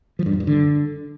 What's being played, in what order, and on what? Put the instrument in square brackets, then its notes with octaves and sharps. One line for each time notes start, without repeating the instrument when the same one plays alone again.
[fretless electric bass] F3
G2
F#2
G2
D3